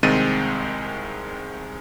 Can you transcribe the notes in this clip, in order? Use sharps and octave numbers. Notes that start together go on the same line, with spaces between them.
C2 D#3 G#3 C4 A6 D#7